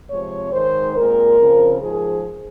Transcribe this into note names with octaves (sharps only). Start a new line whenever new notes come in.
C3 F3 G#3 C4 C#5
G#2 D#3 G#3 C5
A#2 G#3 C4 A#4
C#3 F3 C4
G#2 F3 G#3 G#4